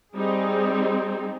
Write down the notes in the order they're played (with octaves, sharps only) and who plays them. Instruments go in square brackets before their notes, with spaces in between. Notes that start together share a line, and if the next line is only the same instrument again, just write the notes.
[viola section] G3 C4 D#4 G#4